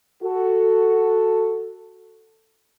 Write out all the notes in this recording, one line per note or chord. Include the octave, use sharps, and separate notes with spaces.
F#4 A4